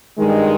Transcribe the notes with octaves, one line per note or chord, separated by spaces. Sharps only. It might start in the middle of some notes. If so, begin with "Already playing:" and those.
G2 D#3 G#3